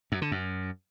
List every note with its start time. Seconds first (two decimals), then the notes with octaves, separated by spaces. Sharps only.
0.12 F#2
0.22 D3
0.32 F#2